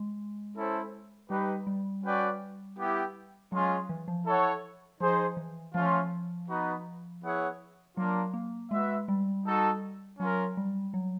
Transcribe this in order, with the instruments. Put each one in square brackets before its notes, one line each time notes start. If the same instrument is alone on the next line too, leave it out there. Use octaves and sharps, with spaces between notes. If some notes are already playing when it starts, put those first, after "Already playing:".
Already playing: [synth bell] G#3
[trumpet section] C#4 E4 A4 C5
[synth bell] G3 [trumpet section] D#4 G4 B4
[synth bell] G3
[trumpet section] C#4 F#4 B4 D5 G5
B3 E4 G4
[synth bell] F#3 [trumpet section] G#3 C#4 F4 G#4
[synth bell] E3
F3
[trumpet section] E4 A4 C#5 F#5
[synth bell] F3 [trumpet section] D#4 G#4 C5
[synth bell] E3
[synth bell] F3 [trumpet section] A3 C#4 F4
[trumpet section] B3 D#4 F#4 B4
B3 E4 G#4 C#5 F#5
[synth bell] F#3 [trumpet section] A#3 D4 F4 A#4
[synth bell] A#3
[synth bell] G#3 [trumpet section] F#4 B4 E5
[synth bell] G3
[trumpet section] D#4 F#4 A4
[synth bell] F#3 [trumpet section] C#4 F4 A#4
[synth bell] G3
F#3